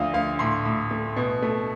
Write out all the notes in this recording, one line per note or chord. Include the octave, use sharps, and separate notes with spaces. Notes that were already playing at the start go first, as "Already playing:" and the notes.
Already playing: D2 F3 F5
D2 F5
A2 C6
A2
A3
B2
A3